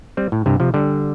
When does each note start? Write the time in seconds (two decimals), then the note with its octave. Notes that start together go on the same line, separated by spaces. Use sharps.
0.17 G3 C4
0.32 A2
0.46 G2 C3
0.60 C3 F3
0.74 D3 G3